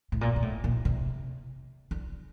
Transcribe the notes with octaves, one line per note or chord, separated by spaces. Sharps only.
A2
A#2
A#2
A2
A#2
C3
D3